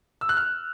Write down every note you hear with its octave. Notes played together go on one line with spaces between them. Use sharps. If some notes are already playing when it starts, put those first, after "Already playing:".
E6
F#6
F6